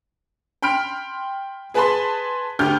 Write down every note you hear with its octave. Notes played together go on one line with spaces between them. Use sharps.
G5 B5 C6 F6 D7
G#4 B4 G#5 A5 B5 C6
D2 G4 F6 G6